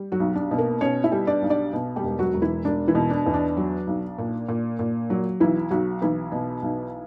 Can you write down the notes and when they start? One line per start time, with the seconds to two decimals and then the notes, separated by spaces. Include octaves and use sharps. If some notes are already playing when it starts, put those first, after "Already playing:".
Already playing: G3
0.12 F#3 F#4
0.20 B1
0.35 D4
0.51 B2
0.58 A#3 A#4
0.81 B2 C#4 C#5
1.04 E4 E5
1.12 G3
1.27 D4 D5
1.42 B1
1.50 D4 D5
1.73 B2
1.96 G3 G4
2.03 E1
2.19 F#3 F#4
2.34 E1
2.42 E3 E4
2.65 E1 D4
2.88 E3 E4
2.95 B2
3.10 D4
3.26 E2
3.34 D4
3.57 F#3
3.87 B1
4.18 A#2
4.48 A#2
4.79 A#2
5.10 F#3
5.40 B1 E3 E4
5.71 B1 F#3 F#4
6.02 B1 E3 E4
6.32 B2
6.62 B1